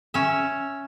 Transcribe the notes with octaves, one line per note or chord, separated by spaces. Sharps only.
C#4 E5